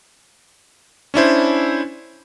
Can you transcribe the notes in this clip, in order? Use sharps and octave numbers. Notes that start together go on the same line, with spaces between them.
C#4 D4 E4 C5